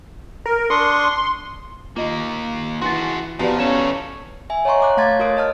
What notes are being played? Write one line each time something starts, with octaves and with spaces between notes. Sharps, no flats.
A#4
D4 C6 C#6 D#6
D#3 A#3 F4 D#5
E3 F#4 G#4 C6 A6
E2 F3 B3 F#4 G4 D5
C#4 A4 C#5 F5 E7
E5 G#5
C#5 D#5 F#5 A#5 C6 C#6
C#5 D6 F#6
A3 F5 A5 C6 G#6 A6
F#4 A#4 C#5 D#6 D7
D#5 A5 F6